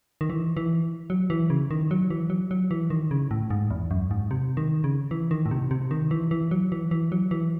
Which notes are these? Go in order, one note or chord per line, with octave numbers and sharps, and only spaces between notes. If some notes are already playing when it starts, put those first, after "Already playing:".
D#3
E3
E3
F#3
E3
C#3
D#3
F#3
E3
F#3
F#3
E3
D#3
C#3
A2
G#2
E2
F#2
G#2
C3
D#3
C#3
E3
D#3
A2
C3
C3
D#3
E3
E3
F#3
E3
E3
F#3
E3